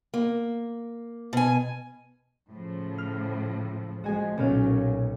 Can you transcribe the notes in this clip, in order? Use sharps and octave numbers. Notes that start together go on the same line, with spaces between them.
A#3
B2 G#5
A2 C#3 F3
F6
F3 G#3 F#4 G#5
B1 A#2 F#3 C#4 F5